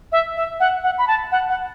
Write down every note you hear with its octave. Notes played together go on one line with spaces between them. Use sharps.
E5
E5
F#5
F#5
B5
A5
F#5
F#5